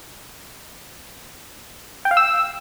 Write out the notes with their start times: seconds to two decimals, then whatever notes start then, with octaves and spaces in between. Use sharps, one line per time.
2.05 G5
2.11 F5
2.17 E6